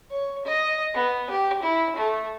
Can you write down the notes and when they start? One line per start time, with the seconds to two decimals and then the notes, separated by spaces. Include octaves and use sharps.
0.11 C#5
0.45 D#5
0.94 B3
1.30 G4
1.63 E4
1.96 A3